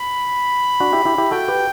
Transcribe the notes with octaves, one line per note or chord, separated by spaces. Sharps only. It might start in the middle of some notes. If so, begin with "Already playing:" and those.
Already playing: B5
D4 F#4
E4 G4
E4 G4
E4 G4
F#4 A4 G5
G4 B4